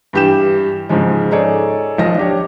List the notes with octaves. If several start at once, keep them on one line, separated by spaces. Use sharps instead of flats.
G2 E3 G4 G6 E7
G#2 C#3 F3 G#3
D#4 G#4 A4 C#5 D5
B1 F3 D#5 A#6
D4 G4 C#5